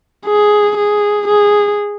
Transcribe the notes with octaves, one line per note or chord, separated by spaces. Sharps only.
G#4
G#4
G#4